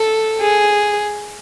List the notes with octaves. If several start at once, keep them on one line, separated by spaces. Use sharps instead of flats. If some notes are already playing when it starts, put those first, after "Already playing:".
Already playing: A4
G#4